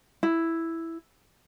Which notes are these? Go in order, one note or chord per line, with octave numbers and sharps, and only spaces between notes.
E4